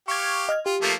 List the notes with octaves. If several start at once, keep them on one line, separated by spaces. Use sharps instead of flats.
G4 F5 C#6 G#6
D#5 F6 G#6
F4 G4
F3 A3 A#3